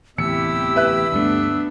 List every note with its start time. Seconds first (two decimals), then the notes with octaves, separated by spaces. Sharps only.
0.18 D1 A1 E2 C3 E4 G4 E6 C#7
0.76 B4 E5 F#6
1.12 D2 G2 A3 B3 D4